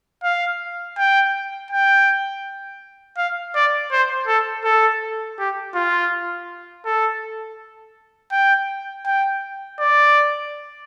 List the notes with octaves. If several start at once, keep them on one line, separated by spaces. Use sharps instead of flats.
F5
G5
G5
F5
D5
C5
A4
A4
G4
F4
A4
G5
G5
D5